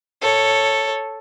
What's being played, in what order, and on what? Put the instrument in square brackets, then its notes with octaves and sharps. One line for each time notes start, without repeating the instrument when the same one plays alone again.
[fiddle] A4 C#5